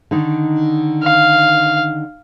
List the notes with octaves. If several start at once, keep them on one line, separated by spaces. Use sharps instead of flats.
D3 D#3 D#4
F5